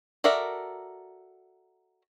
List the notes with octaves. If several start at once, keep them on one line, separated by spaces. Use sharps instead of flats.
F#4 A4 A#4 D5 E5